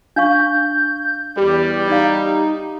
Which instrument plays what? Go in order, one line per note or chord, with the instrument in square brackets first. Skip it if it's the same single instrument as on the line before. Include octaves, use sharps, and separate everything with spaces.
[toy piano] D4 F5 C#6 [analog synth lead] G6
[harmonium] E2 [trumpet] G3 [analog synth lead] G4
[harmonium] D#4 [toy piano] D5 F5